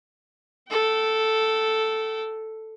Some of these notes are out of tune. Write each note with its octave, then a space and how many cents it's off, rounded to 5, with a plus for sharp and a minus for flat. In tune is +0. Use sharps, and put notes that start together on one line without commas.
A4 +0 G5 -35